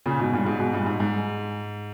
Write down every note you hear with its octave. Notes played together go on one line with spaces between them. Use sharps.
A#2 C#3
G#2 B2
G2 A#2
G#2
G#2 B2
G2 A#2
G#2
G#2